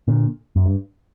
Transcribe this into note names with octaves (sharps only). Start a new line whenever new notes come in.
A#2 D3
F#2
G2